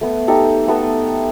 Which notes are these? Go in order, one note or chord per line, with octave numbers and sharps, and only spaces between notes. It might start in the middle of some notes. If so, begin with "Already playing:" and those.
A3 B3
D#4 G4 A4
A3 B3 A4